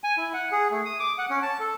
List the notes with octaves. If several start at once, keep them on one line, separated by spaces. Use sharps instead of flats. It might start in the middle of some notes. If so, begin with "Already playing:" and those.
G#5
E4
F#5
G#4
A3
D#6
D6
F#5
C#4
A5
A4